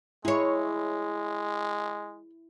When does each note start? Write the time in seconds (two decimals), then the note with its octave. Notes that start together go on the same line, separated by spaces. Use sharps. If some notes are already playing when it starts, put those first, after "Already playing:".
0.25 G#3 E4 G#4 C#5